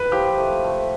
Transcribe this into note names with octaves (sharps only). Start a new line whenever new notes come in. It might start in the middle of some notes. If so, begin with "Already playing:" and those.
Already playing: B4
F3 G4
A3
A3